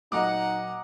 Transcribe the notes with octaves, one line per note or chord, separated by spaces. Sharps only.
A#2 F#3 D#4 D#5 F#5 A#5 D6